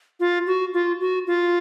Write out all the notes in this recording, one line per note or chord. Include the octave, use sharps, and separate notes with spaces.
F4
F#4
F4
F#4
F4